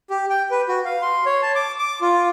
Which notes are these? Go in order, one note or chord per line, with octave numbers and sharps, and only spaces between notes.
G4
G5
B4
F#4
F5
C6
C#5
A5
D6
D6
F4